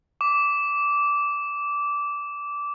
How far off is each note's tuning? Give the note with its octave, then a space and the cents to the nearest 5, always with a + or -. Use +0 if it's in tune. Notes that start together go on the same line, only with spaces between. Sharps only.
D6 -15